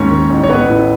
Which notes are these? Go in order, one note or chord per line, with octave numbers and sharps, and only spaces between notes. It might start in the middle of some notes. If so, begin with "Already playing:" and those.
Already playing: D#2 G#2 C#4 C#5
D#3
A1
C#5
A1 B3 B4
A2